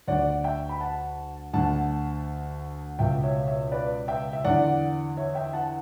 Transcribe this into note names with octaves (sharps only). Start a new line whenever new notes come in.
D2 D3 D5 F#5
E5 G5
B5
F#5 A5
D2 D3 F#5 A5
C#2 B2 E5 G5
C#5 E5
C#5 E5
B4 D5
E5 G5
E5
E2 D3 D5 F#5
C#5 E5
E5 G5
F#5 A5